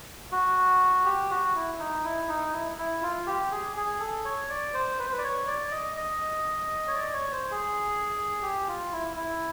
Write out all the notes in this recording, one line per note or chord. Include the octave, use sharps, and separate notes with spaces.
F#4
G4
F#4
E4
D#4
E4
D#4
E4
E4
F4
G4
G#4
G#4
A4
C#5
D5
C5
B4
C5
B4
D5
C#5
D5
D#5
D#5
C#5
D5
C#5
C5
G#4
G4
F4
E4
E4